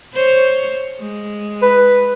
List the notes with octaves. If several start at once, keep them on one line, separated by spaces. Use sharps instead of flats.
C5 C#5
G#3
B4